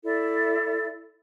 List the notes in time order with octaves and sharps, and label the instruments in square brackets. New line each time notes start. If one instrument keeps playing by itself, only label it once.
[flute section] E4 A4 D5 E5